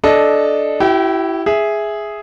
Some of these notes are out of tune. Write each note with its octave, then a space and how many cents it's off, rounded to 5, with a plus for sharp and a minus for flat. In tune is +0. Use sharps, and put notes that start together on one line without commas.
D4 +0 A4 -15 D#5 +0
E4 +0 G4 -45 G5 +0
G#4 +0 E5 +0